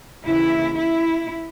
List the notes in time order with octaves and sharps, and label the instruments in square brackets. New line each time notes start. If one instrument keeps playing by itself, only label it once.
[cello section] D#2 C#3 E3 E4
E4